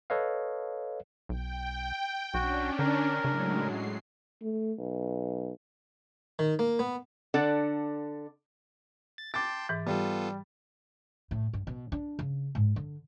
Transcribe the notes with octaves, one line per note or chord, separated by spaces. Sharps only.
A4 B4 C#5 D#5 F5
B1 G5
B1 C#4 D4 F#4
D3 A#4
A2 C#3 F#3 G#3
C7
A3
B1
D#3
A#3
B3
D3 D4 A4 D5 F#5
A6
G5 A5 C6 D6 A6
G#2 E3
G3 B3 F4 A4
A2
G2
B2
D4
C#3
G#2
D3